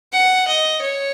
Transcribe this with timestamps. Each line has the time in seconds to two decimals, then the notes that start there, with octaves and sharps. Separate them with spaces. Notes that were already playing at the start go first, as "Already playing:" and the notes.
0.13 F#5
0.48 D#5
0.82 C#5